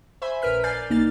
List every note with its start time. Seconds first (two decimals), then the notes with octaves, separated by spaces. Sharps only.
0.22 C5 E5 G#5 B5
0.42 A#1 A#4 B4 F6 B6
0.64 D5 G#5 F6 G6 A6 C7
0.90 C2 A#3 D#4 F6 A6